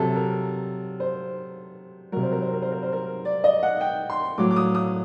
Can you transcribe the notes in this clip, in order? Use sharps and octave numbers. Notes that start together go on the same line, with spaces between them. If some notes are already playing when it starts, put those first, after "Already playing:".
Already playing: C3 F#3 A4
A#4
C5
C3 F#3 A#4
C5
A#4
C5
A#4
C5
A#4
C5
A#4
D5
D#5
F#5
G5
C6
A2 F#3 D6
D6
D#6
D#6